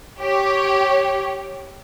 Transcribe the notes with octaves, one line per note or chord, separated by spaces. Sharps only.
G4 C#5